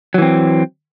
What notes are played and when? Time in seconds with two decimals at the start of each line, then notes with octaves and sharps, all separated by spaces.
0.14 F#3
0.18 E3
0.22 C4